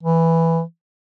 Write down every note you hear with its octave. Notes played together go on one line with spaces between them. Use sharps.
E3